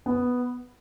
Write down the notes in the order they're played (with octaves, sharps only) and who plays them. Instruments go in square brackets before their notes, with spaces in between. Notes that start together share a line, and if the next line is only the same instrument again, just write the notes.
[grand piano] B3